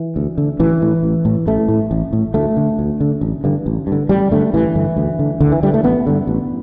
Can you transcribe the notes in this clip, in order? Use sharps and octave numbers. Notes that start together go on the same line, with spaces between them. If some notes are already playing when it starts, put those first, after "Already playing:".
Already playing: E3
D2
D3
A1 E3
A2
A1
A2
A1 A3
A2
A1
A2
D2 A3
D3
D2
D3
A1
G2 D3
A1
G2
D3
A1 G3
G2 D3 A3
A1 E3
G2 D3
D2
D3
D2 D3
E3
D3 G3
A3
A1 B3
G2 D3
A1